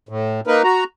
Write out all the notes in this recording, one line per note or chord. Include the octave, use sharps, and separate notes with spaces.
A2
A#3 D#4 A#4 B4
F#4 A#5